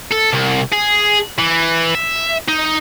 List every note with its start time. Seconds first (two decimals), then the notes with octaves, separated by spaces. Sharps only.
0.12 A4
0.34 C2
0.73 G#4
1.39 E3
1.95 E5
2.48 D#4